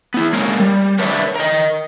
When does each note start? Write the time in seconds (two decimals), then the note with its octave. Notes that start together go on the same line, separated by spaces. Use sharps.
0.14 B3 E4
0.33 G#3 A#3 C#4 A#4
0.60 G3
0.99 D4 A#4 B4 C#5 D5 E5
1.36 A#4 D#5